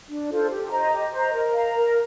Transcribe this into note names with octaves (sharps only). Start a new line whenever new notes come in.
D4
F4 A4 C5
G4
C5 D#5 A#5
G4
C5 D#5 A#5
A#4
F5 A#5
A#4